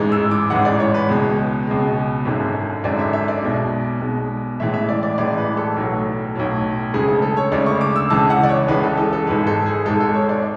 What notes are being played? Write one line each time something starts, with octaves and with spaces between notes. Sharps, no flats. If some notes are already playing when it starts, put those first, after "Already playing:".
Already playing: A1 G#2 E3 G#3
E6
D6
A1 G#2 E3 G#3 F#5
D5
C#5
B4
C#2 B2 G#3
C#2 B2 G#3
G#1 F#2 D3 G#3
G#1 F#2 D3 G#3 D5
E5
E5
D5
B1 B2 G#3
B1 B2 G#3
A1 A2 E3 G#3 E5
E5
D5
D5
A1 A2 E3 G#3 D5
B4
A4
B1 A2 F#3
B1 A2 F#3
D2 C#3 G#3 G#4
A4
A4
C#5
D2 C#3 G#3 D5
C#6
D6
E6
C#2 C#3 E3 G#3 A5
F#5
D5
C#5
C#2 C#3 E3 G#3 B4
A4
A4
A4
G#1 G#2 G#3 B4
A4
G#4
G#1 G#2 G#3 A4
A4
C#5
D5